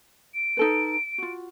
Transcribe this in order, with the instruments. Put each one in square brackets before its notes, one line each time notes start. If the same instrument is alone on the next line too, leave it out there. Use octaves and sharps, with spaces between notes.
[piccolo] D7
[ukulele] D#4 A4 B4
F4 F#4